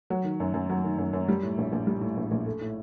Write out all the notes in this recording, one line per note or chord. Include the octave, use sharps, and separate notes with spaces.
F#3
D#3
F#2
F#2
F#3
D#3
F#2
F#2
G3
A2
A#1
A#1
G3
A2
A#1
A#1
A3
A2